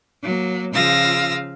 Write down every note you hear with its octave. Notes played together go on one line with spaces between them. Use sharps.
F#3 A#3
C#3 F3 F4 F5 E6 A#6